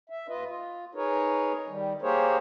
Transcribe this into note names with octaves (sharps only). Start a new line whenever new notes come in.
E5
D#2 F4 B4 D#5
F4
D#4 G#4 A#4 B4 C#5
D#3 G3
A#3 G4 G#4 A#4 C5 C#5